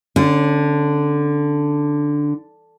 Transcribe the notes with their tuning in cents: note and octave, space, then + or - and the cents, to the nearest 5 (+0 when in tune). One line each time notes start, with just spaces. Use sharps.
D3 +0 C#4 -20